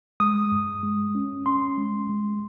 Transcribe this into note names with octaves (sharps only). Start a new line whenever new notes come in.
G#3 D#6
G2
G#3
C#4
C#4 C6
G#3
G#3